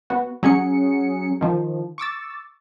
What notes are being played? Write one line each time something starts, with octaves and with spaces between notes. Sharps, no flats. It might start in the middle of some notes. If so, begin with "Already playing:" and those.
B3 F#4
F#3 C#4 G#4 C#7
D#3 F3
C#6 D6 E6 A6